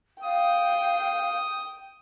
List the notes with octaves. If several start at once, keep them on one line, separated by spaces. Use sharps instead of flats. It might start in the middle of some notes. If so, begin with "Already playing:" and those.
F5 G5 D#6